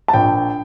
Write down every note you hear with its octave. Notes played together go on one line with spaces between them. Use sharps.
A5
A#1 G5